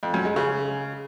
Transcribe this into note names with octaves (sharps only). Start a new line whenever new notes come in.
F2
F#2
G#3
C#3